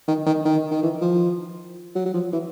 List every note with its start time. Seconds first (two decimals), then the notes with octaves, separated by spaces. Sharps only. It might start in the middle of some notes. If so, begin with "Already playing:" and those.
0.08 D#3
0.26 D#3
0.45 D#3
0.71 D#3
0.83 E3
1.01 F3
1.95 F#3
2.05 F#3
2.14 F3
2.32 E3